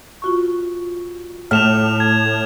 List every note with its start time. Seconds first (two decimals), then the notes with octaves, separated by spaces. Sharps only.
0.22 F4 F#4 C#6
1.51 A2 A3 F6 E7 F7
2.00 G#6